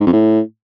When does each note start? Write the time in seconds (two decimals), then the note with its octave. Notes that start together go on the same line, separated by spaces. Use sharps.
0.01 G#2
0.07 F2
0.13 A2